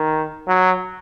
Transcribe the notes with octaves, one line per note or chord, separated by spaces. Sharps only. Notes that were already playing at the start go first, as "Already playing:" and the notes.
Already playing: D#3
F#3